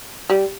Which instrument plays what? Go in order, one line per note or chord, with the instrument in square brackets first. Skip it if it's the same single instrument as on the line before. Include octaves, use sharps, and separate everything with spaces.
[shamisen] G3